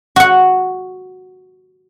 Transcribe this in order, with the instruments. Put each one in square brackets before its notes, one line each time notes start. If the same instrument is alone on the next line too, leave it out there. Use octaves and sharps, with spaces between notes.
[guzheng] F#4 F#5